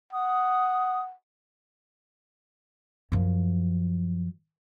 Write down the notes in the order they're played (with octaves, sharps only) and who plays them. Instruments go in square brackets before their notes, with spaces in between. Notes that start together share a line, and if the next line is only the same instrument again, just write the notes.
[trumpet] F#5 [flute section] D#6
[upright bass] F#2 F3